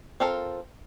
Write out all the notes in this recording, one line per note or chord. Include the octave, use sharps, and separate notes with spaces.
C4 F4 A4 A#4